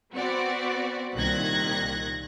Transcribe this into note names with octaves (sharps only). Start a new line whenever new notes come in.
B3 C4 F#4 D5
C2 A#2 D#3 F#6 G#6 A#6